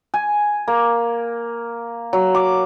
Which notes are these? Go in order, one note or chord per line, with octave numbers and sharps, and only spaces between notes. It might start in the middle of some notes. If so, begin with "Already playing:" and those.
G#5
A#3
F#3
D6